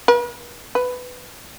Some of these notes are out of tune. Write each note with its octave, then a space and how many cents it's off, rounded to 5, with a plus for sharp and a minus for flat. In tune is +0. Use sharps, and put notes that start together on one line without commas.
B4 -40
B4 +10